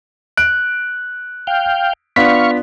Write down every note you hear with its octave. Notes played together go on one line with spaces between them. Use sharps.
F#6 D7
F5 G5
B3 D4 F4 F5 C#6 B6